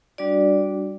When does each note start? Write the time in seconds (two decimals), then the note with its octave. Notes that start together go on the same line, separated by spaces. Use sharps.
0.18 G3 D4 F#4 D5